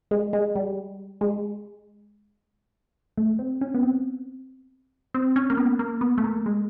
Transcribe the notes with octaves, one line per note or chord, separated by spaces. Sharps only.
G#3
G#3
G3
G#3
A3
C4
C#4
B3
C4
C4
C#4
A#3
B3
A#3
B3
A3
A#3
G#3